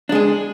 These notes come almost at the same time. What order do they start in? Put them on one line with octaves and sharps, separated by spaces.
D4 G#3 G#4